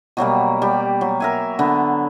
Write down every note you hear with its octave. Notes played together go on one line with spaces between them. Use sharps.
B2 F#3 G3 A#3
G3 G4
F#3
A#4 E5 G#5
D3 B3